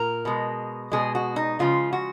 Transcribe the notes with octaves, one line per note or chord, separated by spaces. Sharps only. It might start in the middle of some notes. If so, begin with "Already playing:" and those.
Already playing: A#2 A#4
B2 G#3
B2 G#3 G#4
F#4
D#4
C#3 F3 G#3 F4
F#4